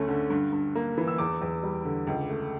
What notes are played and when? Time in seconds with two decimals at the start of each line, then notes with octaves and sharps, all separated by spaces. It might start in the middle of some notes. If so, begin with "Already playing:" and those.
Already playing: D2 A3 C#4
0.08 D3
0.30 G2
0.53 G2
0.75 A#3
0.98 E3
1.08 E6
1.18 E2 D6
1.42 E2
1.63 G3
1.85 D3
2.07 C#2
2.30 A3